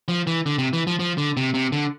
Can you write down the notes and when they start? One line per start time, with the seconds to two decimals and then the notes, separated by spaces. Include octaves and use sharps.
0.08 F3
0.27 E3
0.46 D3
0.58 C3
0.73 E3
0.87 F3
0.99 F3
1.18 D3
1.37 C3
1.54 C3
1.72 D3